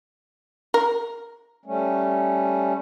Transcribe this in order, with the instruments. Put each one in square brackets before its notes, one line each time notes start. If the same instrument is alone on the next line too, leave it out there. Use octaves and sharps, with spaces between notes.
[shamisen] A#4
[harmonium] G3 A3 C#4